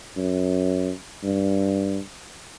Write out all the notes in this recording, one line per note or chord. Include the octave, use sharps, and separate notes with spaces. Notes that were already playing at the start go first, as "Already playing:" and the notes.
F#2
G2